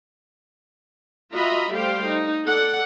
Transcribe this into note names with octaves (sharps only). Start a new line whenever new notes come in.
F4 F#4 D#5 E5 A#5 B5
G3 A3 G4 C5 F5 G5
D#4
A4 D5 F#5